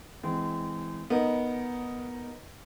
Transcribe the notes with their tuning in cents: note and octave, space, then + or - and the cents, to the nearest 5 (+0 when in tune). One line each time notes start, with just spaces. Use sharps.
E3 -10 G#3 +0 C4 -30
B3 -10 D#4 +0 A#4 +0